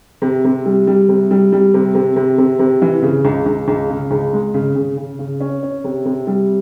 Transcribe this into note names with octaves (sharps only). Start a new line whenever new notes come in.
C3
C3
G3
G3
C3
G3
G3
C3
C3
C3
C3
C3
E3
C#3
C#2
C#2
C#2
C#3
C#2
G#3
C#3
C#3
C#3
C#3
C#4
C#4
C3
C3
G3